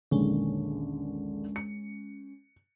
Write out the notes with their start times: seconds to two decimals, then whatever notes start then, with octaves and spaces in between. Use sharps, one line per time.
0.11 A#1 D#2 D3 G#3 C#4
1.56 C#7